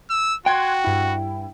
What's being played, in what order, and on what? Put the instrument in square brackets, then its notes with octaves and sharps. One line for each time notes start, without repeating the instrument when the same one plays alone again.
[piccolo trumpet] E6
[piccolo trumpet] F#4 [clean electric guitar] G5 [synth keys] C6 F#6 G#6
[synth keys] G2 E4